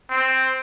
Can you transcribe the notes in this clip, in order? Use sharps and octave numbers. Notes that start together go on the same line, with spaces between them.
C4